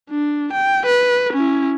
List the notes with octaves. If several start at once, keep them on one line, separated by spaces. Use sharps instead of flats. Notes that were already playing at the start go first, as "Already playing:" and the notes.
D4
G5
B4
C#4 E4